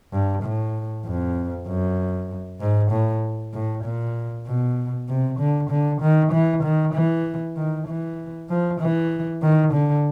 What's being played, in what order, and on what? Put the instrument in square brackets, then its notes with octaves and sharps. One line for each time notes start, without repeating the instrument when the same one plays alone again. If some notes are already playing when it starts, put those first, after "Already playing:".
[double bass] G2
A2
F2
F#2
G#2
A2
A2
A#2
B2
C3
D3
D3
D#3
E3
D#3
E3
D#3
E3
F3
E3
D#3
D3